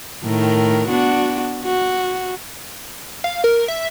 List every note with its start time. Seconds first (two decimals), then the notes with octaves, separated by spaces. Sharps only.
0.23 A2 D#3 A#4
0.89 B3 D4 F#4
1.64 F#4
3.24 F5
3.44 A#4
3.68 E5